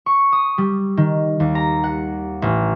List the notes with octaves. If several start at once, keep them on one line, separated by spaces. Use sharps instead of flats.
C#6
D#6
G3
D#3
D#2
A#5
F#5
A1